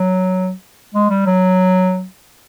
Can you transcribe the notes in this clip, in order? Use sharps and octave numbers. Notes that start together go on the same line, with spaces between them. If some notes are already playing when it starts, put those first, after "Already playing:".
Already playing: F#3
G#3
G3
F#3